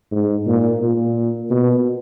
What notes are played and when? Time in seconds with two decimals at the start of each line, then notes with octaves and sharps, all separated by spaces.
0.12 G#2
0.47 A#2
0.82 A#2
1.51 B2